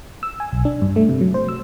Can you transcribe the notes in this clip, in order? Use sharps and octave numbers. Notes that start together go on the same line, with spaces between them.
E6
G#5
B1
D4
G2
A3
C3
F#3
C5
E6